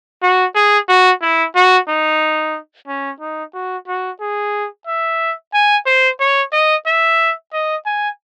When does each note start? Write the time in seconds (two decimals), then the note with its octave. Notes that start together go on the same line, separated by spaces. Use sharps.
0.22 F#4
0.55 G#4
0.88 F#4
1.22 E4
1.55 F#4
1.88 D#4
2.88 C#4
3.20 D#4
3.54 F#4
3.87 F#4
4.20 G#4
4.87 E5
5.54 G#5
5.86 C5
6.20 C#5
6.52 D#5
6.86 E5
7.53 D#5
7.86 G#5